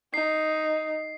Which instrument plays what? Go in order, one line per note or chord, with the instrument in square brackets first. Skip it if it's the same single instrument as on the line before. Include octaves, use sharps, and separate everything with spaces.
[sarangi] D#4 [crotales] C7